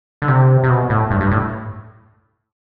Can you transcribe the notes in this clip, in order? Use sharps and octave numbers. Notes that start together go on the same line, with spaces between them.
D3
C3
C3
B2
A2
G2
G2
A2